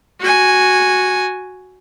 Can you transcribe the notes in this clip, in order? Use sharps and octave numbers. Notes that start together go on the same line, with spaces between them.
F#4 G#5